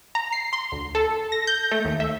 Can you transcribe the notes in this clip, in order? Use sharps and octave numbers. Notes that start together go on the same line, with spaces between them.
A#5
C7
C6
D2
A4
A#6
G6
A3
D#2
E5